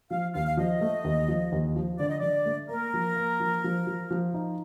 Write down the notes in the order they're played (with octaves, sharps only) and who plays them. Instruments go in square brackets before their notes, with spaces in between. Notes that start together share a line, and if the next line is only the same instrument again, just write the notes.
[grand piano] F3 [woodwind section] F5
[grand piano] D#2 [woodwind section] F5
[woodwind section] F5
[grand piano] F3 [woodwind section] D#5
[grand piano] A3
D#2
F3
D#2
F3
[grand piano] D3 [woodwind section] D5
[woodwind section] D#5
[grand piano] D3 [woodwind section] D5
[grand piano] A3
[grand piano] A#3 [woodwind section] A#4
[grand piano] F3
A#3
F3
F3
F3
F3
D#4